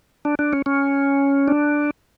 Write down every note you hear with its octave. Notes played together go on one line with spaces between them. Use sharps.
D4
D4
C#4
C#4
D4